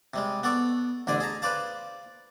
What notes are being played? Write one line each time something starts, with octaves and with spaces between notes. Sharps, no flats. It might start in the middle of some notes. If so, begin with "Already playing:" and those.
C3 G3 G#3
B3 A4 D5 C#6
A1 D3 C5 D5 G#5
G#4 A5 A#5
B4 C5 D5 F5 A5